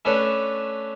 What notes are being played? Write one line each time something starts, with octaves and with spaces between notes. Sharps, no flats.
A3 C#4 D4 B4 C#5 A5